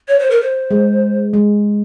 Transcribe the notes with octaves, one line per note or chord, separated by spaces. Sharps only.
C#5
C5
A#4
C5
G#3
G#3